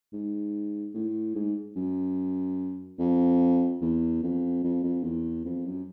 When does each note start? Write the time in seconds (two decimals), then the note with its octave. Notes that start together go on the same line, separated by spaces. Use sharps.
0.13 G#2
0.94 A2
1.35 G#2
1.76 F#2
2.99 F2
3.81 E2
4.23 F2
4.64 F2
4.84 F2
5.04 E2
5.44 F2
5.66 F#2